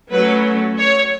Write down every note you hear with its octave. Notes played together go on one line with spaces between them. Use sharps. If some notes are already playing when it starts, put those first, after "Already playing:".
F#3 A3 C#4 B4
C#5